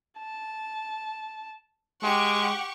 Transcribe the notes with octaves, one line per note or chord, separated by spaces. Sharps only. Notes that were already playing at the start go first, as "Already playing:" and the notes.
A5
G#3 G4 F#5 C#6 D6